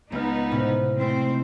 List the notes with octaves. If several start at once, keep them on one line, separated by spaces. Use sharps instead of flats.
C#2 B3 D#4 F6
A2 C3 C#4
G#3 A3 C4 E4 C5